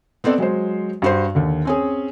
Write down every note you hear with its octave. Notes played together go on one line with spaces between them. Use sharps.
B3 C4 A4 D5
F#3 G#3 C5
G2 F#4 C5
D#2 D3
C4 C#4 G#4